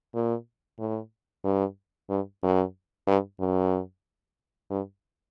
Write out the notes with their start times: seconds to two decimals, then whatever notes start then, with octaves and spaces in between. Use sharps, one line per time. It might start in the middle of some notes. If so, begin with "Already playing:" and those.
0.15 A#2
0.79 A2
1.45 G2
2.09 G2
2.43 F#2
3.07 G2
3.40 F#2
4.70 G2